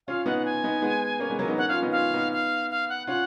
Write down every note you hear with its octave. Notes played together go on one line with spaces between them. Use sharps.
C#4 F4 F5
B3 D#4 F#5
F#5
G#5
B3 D#4
G#3 B3
A#3 C#4
G#3 B3
F#3 A#3
B3 D#4
A#3 C#4 F#5
C#4 F4 F5
B3 D#4
C#4 F4 F5
B3 D#4
F5
F5
F#5
C#4 F4 F#5